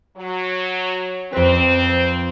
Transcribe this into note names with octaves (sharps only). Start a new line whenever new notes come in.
F#3
F2 C4 B4